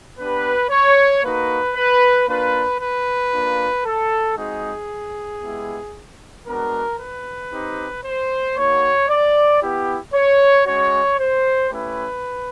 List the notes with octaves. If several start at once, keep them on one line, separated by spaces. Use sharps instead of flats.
B3 D4 G4 B4
C#5
A#3 D#4 F#4 B4
B4
A#3 D4 F4 B4
B4
A#3 D4 F4
A4
G#3 C4 D#4 F#4 G#4
G#3 B3 E4 G4
G#3 B3 D4 F#4 A#4
B4
C4 D#4 G4
C5
A#3 D#4 F#4 C#5
D5
B3 E4 G4
C#5
G#3 C#4 F#4 C#5
C5
A3 C#4 E4 G4 B4